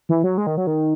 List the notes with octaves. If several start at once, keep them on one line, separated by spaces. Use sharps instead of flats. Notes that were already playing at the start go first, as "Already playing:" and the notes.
E3
F#3
G#3
D#3
F#3
D#3